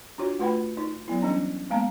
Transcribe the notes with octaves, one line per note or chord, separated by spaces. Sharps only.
D4 F4 F#4 C#5
A3 F4 B4 F#5 G5 B5
D#4
F#3 B3 E4
E3 G3 C#4 D4
G#3 A#3 B3 F5 A5 A#5